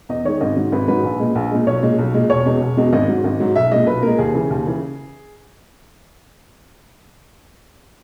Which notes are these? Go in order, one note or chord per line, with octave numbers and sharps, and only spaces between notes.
E2 D#5
D#3 G#3 C#5
G#1 D#5
G#2 D#3 F#3
G#1 B4
G#2 D#3 F#3 B4
A#1
A#2 G#3
A#1
A#2 G#3
B1 C#5
A#2 G#3
B1
A#2 G#3
E1 C#5
E2 B2 G#3
E1
E2 B2 G#3
G#1 D#5
G#2 F#3
G#1
G#2 F#3
B1 E5
A#2 G#3 D#5
B1 B4
A#2 G#3 A#4
D#2 G#4
C#3 E3
D#2
C#3 E3